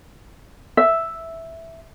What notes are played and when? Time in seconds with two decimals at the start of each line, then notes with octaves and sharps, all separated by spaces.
0.77 E5